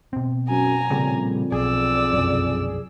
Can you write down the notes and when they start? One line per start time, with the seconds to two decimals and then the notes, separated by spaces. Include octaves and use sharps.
0.13 B2 C4
0.49 F#2 G#5 A#5
0.90 F2 A#2 C#3 G3
1.52 B1 G#4 D5 E6
2.13 F1 B1 F#2